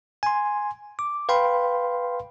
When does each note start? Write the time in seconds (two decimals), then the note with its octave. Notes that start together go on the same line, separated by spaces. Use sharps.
0.23 G#5 C6
0.99 D6
1.29 B4 F5 G5 B5 C6